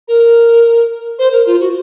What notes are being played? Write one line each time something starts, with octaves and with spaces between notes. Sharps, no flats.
A#4
C5
A#4
F4
F#4